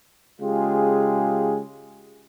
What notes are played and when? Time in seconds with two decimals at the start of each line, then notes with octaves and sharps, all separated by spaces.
0.41 C#3 G#3 F4 G4 G#4